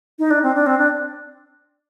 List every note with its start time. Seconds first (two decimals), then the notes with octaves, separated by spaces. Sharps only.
0.19 D#4
0.30 D4
0.43 C4
0.55 D4
0.66 C4
0.78 D4